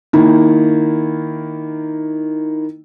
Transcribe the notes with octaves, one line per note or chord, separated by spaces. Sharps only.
D#3 A#3 E4